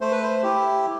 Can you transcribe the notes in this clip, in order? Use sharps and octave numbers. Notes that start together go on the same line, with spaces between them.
A3 C5
B4
C5
E4 G4